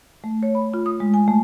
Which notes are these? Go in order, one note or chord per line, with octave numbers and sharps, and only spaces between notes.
A3
C#5
B5
F4
D#6
G#3
G#5
A3